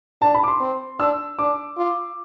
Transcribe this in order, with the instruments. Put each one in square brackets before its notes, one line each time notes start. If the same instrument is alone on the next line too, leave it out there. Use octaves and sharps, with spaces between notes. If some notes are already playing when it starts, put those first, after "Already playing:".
[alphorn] D4 [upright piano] A5
[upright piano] B5
D6
C6
[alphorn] C4
[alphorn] D4 [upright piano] E6
[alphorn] D4 [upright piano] D6
[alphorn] F4